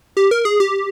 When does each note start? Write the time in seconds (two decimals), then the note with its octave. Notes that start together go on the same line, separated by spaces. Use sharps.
0.17 G4
0.31 A#4
0.45 G#4
0.60 G4